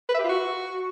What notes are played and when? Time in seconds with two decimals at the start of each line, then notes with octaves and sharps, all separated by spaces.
0.09 B4
0.14 E5
0.19 G4
0.24 F4
0.29 F#4